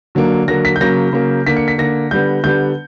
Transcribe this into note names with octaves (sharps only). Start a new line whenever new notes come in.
D3 F#3 A#3
D3 F#3 A#3 A#6
B6
G6
C#3 F#3 A#3 A#6
C#3 F#3 A#3
D3 A#3 B6
C#7
B6
D3 A#3 A#6
D3 G3 B3 G6
D3 G3 B3 G6